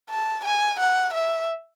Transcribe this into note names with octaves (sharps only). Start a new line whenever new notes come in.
A5
G#5
F#5
E5